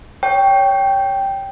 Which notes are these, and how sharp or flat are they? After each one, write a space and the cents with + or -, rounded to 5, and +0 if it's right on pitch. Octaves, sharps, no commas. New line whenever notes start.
C#5 +15 G5 +0